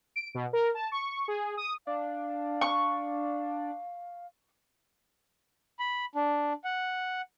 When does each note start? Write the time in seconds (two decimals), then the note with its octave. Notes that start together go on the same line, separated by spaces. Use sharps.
0.16 D7
0.35 B2
0.53 A#4
0.75 A5
0.92 C#6
1.28 G#4
1.57 D#6
1.87 D4 F5
2.61 C#6
5.79 B5
6.15 D4
6.64 F#5